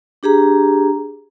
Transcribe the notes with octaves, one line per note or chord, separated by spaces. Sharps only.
D4 G4 G#4 A#5